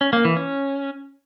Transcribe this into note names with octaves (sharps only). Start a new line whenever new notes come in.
C#4
A#3
E3
C#4